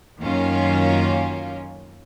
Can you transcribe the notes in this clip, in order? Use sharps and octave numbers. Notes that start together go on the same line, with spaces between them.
F#2 D#3 A#3 C#4 F4